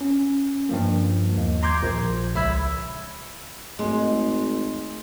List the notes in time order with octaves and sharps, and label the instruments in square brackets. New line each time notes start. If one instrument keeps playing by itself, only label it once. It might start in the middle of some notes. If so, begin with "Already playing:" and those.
[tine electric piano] C#4
G2 F3 A#3
D#2
A#5 C6 D6 G6 G#6
A#1
C#2 E5 B5 E6 G#6
[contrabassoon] G#1 [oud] G#3 [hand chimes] A3 C6